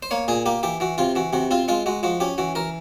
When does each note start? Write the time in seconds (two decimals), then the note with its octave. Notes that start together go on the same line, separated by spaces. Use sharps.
0.03 C5
0.11 A#3 C#5
0.28 A#2 G#4
0.46 A#3 G4
0.63 E3 G4
0.80 E3 F#4
0.98 C3 F4
1.16 E3 F#4
1.33 C3 F#4
1.51 C4 F4
1.68 G#3 F4
1.86 G#3 F#4
2.03 F3 F#4
2.20 C#4 G4
2.38 E3 F#4
2.55 E3 A#4